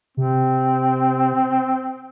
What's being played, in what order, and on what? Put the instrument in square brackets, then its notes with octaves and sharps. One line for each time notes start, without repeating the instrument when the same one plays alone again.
[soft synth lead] C3 [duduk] C4